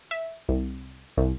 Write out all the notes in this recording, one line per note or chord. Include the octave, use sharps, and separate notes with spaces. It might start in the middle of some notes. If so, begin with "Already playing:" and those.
E5
C2
C2